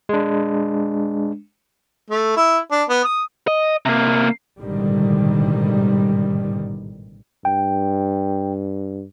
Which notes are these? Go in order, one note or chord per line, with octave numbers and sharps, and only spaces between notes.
G#3 D4
A3
E4
D4
B3
D#6
D#5
C3 A#3
A1 G#2 B2 D3 D#3 G3
G2 G5